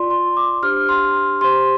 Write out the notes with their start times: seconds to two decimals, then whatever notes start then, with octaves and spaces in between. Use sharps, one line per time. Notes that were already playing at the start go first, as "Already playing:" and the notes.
Already playing: F4 D5 C6
0.10 C6
0.37 D6
0.63 D4 G4 C5 F6
0.89 C6
1.41 G4 C5 C6